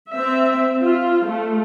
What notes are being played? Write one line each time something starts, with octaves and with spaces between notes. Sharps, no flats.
C4 E5
F4
A3